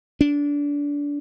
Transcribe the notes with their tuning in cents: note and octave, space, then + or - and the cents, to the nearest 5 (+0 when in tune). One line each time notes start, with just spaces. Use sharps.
D4 -25